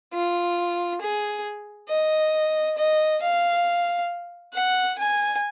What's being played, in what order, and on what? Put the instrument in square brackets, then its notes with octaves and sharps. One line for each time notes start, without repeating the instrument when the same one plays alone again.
[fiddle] F4
G#4
D#5
D#5
F5
F#5
G#5